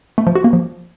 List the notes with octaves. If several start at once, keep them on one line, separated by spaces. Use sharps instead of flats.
A3
F3
F#4
A#3
F3